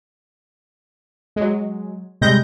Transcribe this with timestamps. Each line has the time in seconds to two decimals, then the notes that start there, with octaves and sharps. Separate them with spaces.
1.36 F#3 G#3
2.21 C3 G3 G#3 G6 A#6